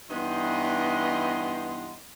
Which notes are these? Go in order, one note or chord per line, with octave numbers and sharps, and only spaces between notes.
G2 E3 B3 D#4 D#5 C6